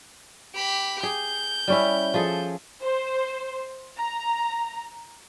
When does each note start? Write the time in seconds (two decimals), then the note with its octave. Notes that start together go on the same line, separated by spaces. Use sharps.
0.55 G4 B5
1.03 G#4 G6
1.68 G3 C#4 E4
2.14 F3 G#4 A4
2.82 C5
3.98 A#5